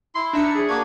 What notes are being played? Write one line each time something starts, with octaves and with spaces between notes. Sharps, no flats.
E4 C6
D4 D#4 E5 C#7
G#4
A#3 D4 F#4 G#6